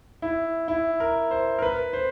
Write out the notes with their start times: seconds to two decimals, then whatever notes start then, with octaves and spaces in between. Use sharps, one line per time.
0.22 E4
0.68 E4
1.00 A#4
1.31 C5
1.59 A#4
1.62 B4
1.93 C5